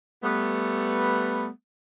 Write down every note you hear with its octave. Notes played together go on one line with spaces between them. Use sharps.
G3 A3 B3